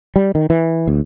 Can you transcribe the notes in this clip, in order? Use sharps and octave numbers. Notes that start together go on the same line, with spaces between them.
G3
D#3
E3
D2